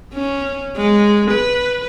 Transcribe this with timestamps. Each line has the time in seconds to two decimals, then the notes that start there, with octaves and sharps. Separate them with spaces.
0.14 C#4
0.77 G#3
1.31 B4